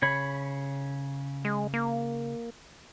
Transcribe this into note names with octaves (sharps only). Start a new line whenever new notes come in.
C#3 C#5 B5
G#3
A#3